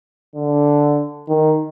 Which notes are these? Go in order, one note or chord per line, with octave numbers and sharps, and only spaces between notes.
D3
D#3